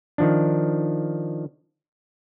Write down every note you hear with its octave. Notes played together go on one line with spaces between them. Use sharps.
D#3 F3 D4